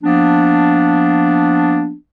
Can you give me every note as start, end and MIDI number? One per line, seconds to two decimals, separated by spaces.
0.03 1.93 53
0.03 1.93 58
0.03 1.93 59
0.03 1.93 62